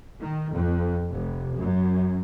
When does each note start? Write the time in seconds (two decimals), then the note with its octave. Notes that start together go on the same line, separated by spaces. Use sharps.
0.22 D#3
0.53 F2
1.13 F1
1.61 F#2